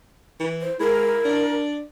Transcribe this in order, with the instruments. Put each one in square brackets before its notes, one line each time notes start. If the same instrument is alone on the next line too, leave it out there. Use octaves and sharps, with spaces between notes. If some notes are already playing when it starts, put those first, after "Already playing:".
[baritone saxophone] E3
[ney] C5
[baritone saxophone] G#3 [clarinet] E4 [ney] A#4
[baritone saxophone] D4